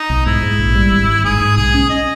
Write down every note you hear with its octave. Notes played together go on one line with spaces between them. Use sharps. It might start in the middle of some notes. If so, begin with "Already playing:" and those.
Already playing: D#4
B1
G#2 E4
G#2
A#1
G3
G#1
G#1
G#2 G#4
G#2
B1 G#4
C#4
D#5